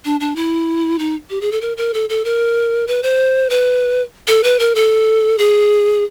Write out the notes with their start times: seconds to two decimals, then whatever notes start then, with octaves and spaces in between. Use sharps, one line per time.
0.05 D4
0.20 D4
0.36 E4
0.99 D#4
1.30 G4
1.41 G#4
1.52 A4
1.61 A#4
1.77 A#4
1.94 A4
2.09 A4
2.25 A#4
2.87 B4
3.03 C5
3.50 B4
4.28 A4
4.43 B4
4.59 A#4
4.75 A4
5.38 G#4